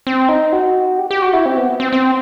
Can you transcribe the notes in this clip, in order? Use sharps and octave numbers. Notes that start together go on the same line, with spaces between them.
C4
D#4
F#4
G4
G4
F#4
E4
C4
B3
C4
C4